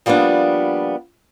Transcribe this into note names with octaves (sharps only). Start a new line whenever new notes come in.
F3 G3 A#3 B3 D4